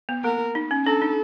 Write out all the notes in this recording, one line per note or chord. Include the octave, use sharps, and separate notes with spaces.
B3
A#3 A#4
D#4
C#4
D4 A4
D#4